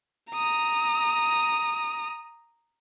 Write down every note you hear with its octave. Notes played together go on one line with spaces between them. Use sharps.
A#5 D#6